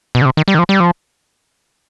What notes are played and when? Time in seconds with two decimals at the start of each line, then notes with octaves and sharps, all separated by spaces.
0.15 B2
0.22 D3
0.25 C3
0.37 D#3
0.48 G3
0.55 D#3
0.59 F3
0.69 G3
0.80 F3